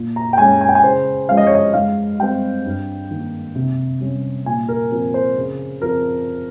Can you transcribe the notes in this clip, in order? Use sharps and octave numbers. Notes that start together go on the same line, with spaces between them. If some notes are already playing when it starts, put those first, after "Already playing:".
Already playing: A#2
A#5
G5
G#3 C#4 G#5
G#5
G5
G#5
C#3 C5
F3 G#3 C#4 F5
D#5
C#5
D#5
G#2 F5
G3 C4 G5
G2
D#3 A#3
C3
G3 C#4
A#2 G#5
A#4
F3 C4 A#4
C5
C#3
F3 C4 A#4